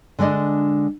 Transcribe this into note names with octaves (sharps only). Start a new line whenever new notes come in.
D3 G#3 D4 D5 D#5